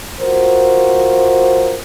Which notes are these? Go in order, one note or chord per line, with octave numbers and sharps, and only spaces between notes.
F4 F#4 A#4 C5